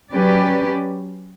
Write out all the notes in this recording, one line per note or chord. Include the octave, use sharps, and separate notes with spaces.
F#3 C#4 G4 B4 D5